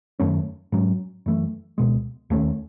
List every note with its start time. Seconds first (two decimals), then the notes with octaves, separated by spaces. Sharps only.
0.20 F#2 D#3 A3 C#4
0.72 G#2 F#3 C#4
1.26 F#2 E3 A3
1.78 C#2 B2 G#3
2.30 D#2 D#3 A3 C#4